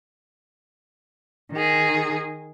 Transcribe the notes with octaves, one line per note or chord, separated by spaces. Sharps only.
D#3 G#4